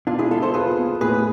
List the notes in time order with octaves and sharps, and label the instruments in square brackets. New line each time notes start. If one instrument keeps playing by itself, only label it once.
[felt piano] B2 [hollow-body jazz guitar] D4 F4
[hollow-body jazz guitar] E4 G#4
[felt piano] G#3 [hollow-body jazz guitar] F4 A4
[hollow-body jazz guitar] A4 C5
[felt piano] F4 [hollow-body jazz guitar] G#4 B4
[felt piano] B3
[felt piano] A2 [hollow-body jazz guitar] G#4 B4